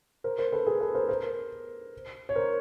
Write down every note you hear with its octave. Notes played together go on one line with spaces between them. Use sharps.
A#4 C5
A#4 C5
A4 B4
G#4 A#4
A4 B4
A#4 C5
A#4 C5
C#5
A#4 C5